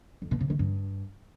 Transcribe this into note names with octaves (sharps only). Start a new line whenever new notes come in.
F2
B2
C3
D#3
G2